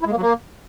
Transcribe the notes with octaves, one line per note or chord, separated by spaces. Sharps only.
E4
G#3
A#3
F#3
A#3